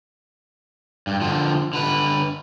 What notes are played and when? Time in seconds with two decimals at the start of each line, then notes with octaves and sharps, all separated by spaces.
1.07 G2
1.21 D3 F3
1.73 D3 B4